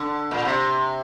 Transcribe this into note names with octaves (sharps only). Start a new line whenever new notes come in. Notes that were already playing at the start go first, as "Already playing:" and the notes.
Already playing: D3
A#2
C3